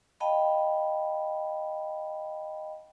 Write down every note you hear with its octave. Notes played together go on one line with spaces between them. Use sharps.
D#5 F5 G5 A5 B5